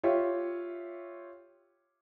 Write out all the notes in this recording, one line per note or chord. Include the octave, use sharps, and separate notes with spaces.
F4 G4 C#5 E5